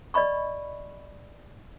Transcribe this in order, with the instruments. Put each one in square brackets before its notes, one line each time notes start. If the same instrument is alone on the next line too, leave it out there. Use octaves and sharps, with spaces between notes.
[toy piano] D5 D#5 B5 C#6